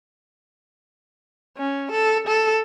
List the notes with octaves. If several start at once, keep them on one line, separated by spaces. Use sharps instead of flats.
C#4
A4
A4